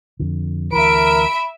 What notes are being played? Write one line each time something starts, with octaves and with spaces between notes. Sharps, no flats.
F2 D3
D2 E3 A#4 E5 B5 B6 D7